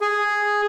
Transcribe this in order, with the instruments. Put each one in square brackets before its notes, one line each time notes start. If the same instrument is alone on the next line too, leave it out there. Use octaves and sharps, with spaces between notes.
[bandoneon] G#4